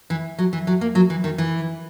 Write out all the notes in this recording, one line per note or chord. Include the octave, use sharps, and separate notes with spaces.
E3
F#3
E3
F#3
A#3
F#3
E3
D#3
E3